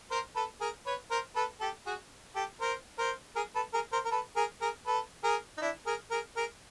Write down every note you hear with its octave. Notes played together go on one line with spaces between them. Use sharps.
A#4 C5
A4 B4
G#4 A#4
B4 C#5
A#4 C5
A4 B4
G4 A4
F#4 G#4
G4 A4
A#4 C5
A#4 C5
G#4 A#4
A4 B4
G#4 A#4
A#4 C5
A#4
A4 B4
G#4 A#4
G#4 A#4
A4 B4
G#4 A#4
D#4
D4 E4
G#4 A#4
G#4 A#4
G#4 A#4